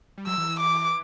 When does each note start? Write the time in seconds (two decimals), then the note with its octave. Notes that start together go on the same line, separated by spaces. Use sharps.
0.18 G3
0.27 F#3 E6
0.38 E3
0.49 E3
0.59 D6